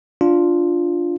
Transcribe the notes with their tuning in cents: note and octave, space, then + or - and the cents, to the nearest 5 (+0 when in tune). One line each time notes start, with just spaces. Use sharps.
D4 +0 F4 +0